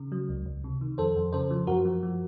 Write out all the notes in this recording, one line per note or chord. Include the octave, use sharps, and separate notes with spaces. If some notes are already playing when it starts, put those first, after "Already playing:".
Already playing: C#3
F#3
C#2
C#2
C3
D#3
F2 A4 C5
F2
C#3 A4 C5
F3
F#2 F#4 A#4
F3
F3